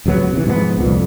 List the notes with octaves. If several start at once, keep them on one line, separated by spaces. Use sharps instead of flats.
D1 C#2 F#3 B3
C3 E3
G#2 F3 F#3 B3
C2 F2 A#2